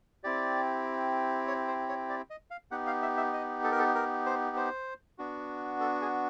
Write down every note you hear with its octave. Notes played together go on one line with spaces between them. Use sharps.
C4 E4 G4 D5
C#5
C5
C#5
D5
D#5
F5
B3 D#4 G4 F#5
F5
E5
E5
D#5
A4
A#4
A4
A#4
C5
C5
B3 D4 F#4
A4
G#4